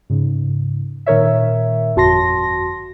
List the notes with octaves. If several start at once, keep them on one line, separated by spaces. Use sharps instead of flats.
G#2 C#3
A#2 D#3 A#4 C#5 E5
G1 F2 F#4 A5 C6 A#6